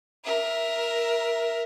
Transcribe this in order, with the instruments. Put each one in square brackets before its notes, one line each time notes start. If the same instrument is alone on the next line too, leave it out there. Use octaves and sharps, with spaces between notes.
[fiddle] A#4 E5